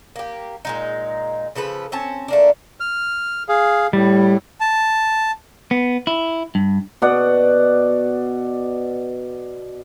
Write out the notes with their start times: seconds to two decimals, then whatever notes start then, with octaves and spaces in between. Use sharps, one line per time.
0.16 A#3 G4
0.65 A#2 G#3 D#4
1.55 C#3 F3 A4 B4
1.92 C4 C#4 A5
2.28 A3 A#3 D4
2.80 F6
3.49 G#4 F5
3.93 A2 G3
4.61 A5
5.71 B3
6.07 E4
6.55 G2
7.02 B2 D5 F#5